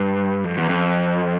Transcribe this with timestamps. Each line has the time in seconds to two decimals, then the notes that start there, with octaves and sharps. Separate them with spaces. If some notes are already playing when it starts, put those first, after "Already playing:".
Already playing: G2
0.44 F2
0.58 E2
0.69 F2